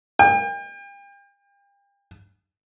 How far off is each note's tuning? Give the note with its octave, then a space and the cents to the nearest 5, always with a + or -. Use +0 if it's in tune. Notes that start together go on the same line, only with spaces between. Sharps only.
G5 +40